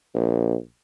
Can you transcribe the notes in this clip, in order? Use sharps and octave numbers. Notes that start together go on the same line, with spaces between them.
A#1